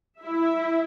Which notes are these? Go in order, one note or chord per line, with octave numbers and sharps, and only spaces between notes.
E4 E5